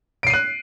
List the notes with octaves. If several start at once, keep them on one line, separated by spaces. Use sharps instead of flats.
F#6 C7 D7 D#7